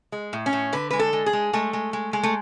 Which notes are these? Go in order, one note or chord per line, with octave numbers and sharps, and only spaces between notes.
G#3
A2
C#4
A2
D3 B4
G#3 B4
A4
G#3
G#4
G#3
G#3 A3
G#3
G#3
G#3
A3